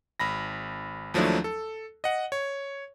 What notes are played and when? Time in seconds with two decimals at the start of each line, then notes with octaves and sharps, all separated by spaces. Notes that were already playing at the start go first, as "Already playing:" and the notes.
0.20 G#1 B5 A#6
1.14 D#2 F3 F#3 A3 D4 E4
1.44 A4
2.04 D#5 F#5
2.32 C#5